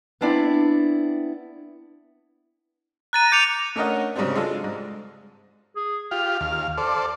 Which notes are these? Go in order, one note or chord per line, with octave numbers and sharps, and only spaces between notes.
B3 C4 D4 E4 D5
A#5 F#6 A6 D#7
D6 G6 C#7 F7
A3 C#4 D4 A#4 D#5 F#5
G#2 C#3 F#3 G3 C4 D4
G#3 D4 F4 A4
G#2
G#4
F4 G4 F6
D#2 F5
A4 C5 D5